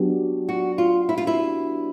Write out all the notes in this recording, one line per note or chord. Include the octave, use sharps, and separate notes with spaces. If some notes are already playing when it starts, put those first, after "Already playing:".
Already playing: F#3 B3 D4 G4
F#4
F4
E4
F4
E4